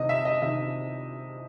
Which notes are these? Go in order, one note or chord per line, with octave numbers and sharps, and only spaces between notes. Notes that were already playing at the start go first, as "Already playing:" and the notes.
Already playing: C3 D#3 D#5
E5
D#5
C3 D#3 E5